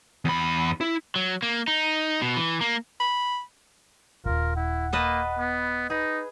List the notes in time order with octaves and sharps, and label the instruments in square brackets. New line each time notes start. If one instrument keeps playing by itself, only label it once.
[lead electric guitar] E2 B5
E4
[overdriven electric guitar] F#3
A#3
D#4
B2
E3
A#3
[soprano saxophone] B5
[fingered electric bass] D#1 G#1 [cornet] F4 [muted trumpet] A#4
[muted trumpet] E4 [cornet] F#5
[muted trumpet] A#3 [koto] B4 D#5 A5
[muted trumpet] B3
[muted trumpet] D#4 [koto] G#4 [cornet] B4